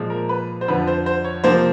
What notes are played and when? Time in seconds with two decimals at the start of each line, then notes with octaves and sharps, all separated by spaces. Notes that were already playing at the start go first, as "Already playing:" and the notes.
Already playing: A#2 F3 G#3
0.10 A#4
0.29 B4
0.61 C5
0.68 F2 D3 F3 B4
0.87 C5
1.06 C5
1.24 C#5
1.44 C3 F3 A#3 C5